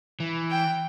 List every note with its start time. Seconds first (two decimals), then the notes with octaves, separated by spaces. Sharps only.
0.20 E3
0.51 G5